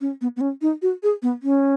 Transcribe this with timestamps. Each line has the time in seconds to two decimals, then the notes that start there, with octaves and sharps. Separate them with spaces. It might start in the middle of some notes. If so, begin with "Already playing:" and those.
0.01 C#4
0.21 B3
0.36 B3
0.41 C#4
0.62 D#4
0.82 F#4
1.03 G#4
1.22 B3
1.43 C#4